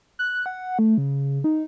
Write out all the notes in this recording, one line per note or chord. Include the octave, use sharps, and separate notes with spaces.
F#6
F#5
A3
C#3
D#4